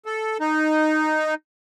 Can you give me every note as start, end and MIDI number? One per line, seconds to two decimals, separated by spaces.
0.06 0.38 69
0.40 1.34 63